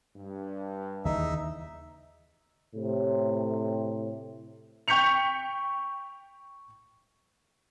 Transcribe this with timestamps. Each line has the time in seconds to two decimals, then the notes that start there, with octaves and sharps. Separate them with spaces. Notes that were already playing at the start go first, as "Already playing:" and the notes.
0.16 G2
1.05 D#2 C#3 E3 D#4 E5
2.75 A2 C3
4.88 G5 C#6 G6 B6 C#7 F7